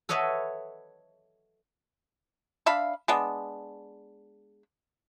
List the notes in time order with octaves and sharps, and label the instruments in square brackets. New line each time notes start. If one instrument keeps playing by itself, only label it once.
[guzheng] A4 B4 C#5 D#5 E5 F#5
[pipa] D4 E5 F5 B5
G#3 B3 D4